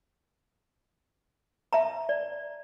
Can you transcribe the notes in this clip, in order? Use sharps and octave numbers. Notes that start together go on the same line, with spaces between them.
E5 A5 A#5
D5